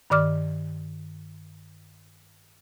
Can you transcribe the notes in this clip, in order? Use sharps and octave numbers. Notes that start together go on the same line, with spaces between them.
G2 D#3 D5 D6 F6